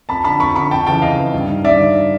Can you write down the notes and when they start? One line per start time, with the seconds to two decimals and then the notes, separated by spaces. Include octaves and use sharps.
0.09 F2 A5 B5
0.24 D3 A5 B5
0.40 F2 B5 C#6
0.56 D3 B5 C#6
0.71 F2 G5 A5
0.87 C#3 E3 G5 A5
1.02 F2 D#5 F5
1.18 C#3 E3
1.34 G2
1.49 D#3
1.64 G2 D5 E5
1.80 D#3